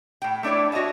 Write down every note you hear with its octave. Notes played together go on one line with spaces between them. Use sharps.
A2 G5
A3 D4 E4 C#5 D5
F#4 C#5 D#5 E5 A5